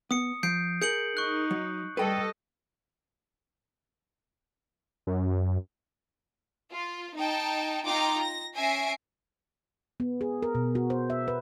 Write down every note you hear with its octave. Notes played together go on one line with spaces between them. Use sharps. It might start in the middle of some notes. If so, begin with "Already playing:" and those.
B3 D#6 C#7
F3 G6 C7 D7
G#4 A#4 G6 C#7 F#7
D#4 C#6 F#6
F#3
G3 A4 B4 D#5 G5
F#2
F4
D#4 G5 A5
D#4 F4 G5 A#5 D6
A#6
C#4 E5 G#5 A#6 C7 D7
B3
G#4
A#4
B2
F#4
C5
E5
B4